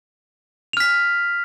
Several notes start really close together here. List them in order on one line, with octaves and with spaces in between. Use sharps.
F7 F6 B6